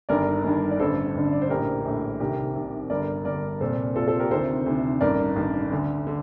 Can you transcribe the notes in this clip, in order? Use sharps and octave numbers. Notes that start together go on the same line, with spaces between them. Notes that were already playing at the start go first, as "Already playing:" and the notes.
G1 G2 D#3 A#4 D5
G1 G2 D#3
D5
A1 G2 D3 A4 C5
A1 G2 D3
D5
C5
A#1 A2 G4 A#4
A#1 A2
C2 C3 D#3 G4 A#4
C2 C3 D#3
G1 G2 D3 A#4 D5
G1 G2 D3 A#4 D5
C2 A#2 A4 C5
C2 A#2 F4 A4
A4 C5
G4 A#4
D2 C3 D#3 A4 C5
D2 C3 D#3
A1 G2 D#3 A#4 D5
A1 G2 D#3
D2 D3
D3